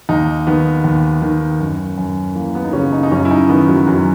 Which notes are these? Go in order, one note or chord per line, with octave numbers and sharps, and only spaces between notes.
D#2 D#4
D#3 B3
D#2
D#3
F#2
F#2
E3 A#3
B3
D#4
C#3 C#4
D#4
D#4
F#2 C#4
E4
D#4
D#3 B3
F#3
F#2 F#3